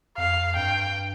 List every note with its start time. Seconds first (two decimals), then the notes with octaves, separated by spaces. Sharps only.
0.18 F2 F5
0.56 G2 G5